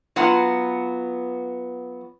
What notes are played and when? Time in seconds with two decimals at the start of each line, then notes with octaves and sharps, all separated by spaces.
0.16 F#3 B3 F4 F#5